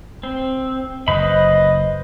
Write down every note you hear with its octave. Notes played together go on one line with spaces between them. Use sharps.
C4
F#1 B4 C5 D#5 B5